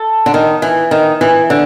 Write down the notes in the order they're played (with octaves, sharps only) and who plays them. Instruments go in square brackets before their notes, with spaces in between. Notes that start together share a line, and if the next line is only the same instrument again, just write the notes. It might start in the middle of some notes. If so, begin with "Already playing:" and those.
Already playing: [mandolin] A4
[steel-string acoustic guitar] D3
D#3
E3
D#3
E3
D3